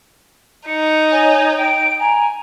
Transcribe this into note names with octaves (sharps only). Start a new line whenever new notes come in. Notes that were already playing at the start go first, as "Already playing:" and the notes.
D#4 C#7
C#5 G#5
G5 D7
G#5 A#5